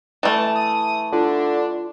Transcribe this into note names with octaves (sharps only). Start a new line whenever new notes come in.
E3 A3 A5
D#6
D3 D4 F4